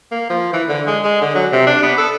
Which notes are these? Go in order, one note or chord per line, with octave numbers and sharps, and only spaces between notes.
A#3
F3
E3
D3
G#3
G#3
D3
F#3
C3
D4
B3
A4